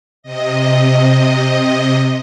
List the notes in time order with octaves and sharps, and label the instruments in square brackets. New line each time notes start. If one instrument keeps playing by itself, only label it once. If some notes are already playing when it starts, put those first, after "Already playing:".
[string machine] C3 D#5